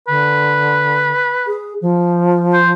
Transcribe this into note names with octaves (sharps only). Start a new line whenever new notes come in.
D3 B4
G#4
F3
C5